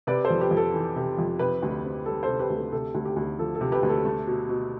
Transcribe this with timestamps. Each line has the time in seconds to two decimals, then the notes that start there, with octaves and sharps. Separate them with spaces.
0.07 C3 B4 D5
0.24 A4 C5
0.30 F2
0.40 G4 B4
0.51 F2
0.57 A4
0.74 E3
0.96 C3
1.19 F2
1.39 C3 G4 B4
1.62 D2
1.84 C4
2.06 G3 A4
2.23 A4 C5
2.29 C3
2.39 G4 B4
2.50 D2
2.56 A4
2.72 C3 A4
2.94 D2
3.05 G4
3.16 D2
3.39 F3 A4
3.55 A4
3.61 C3
3.72 G4 B4
3.83 D2
3.89 A4
4.05 A3
4.27 B2
4.49 B2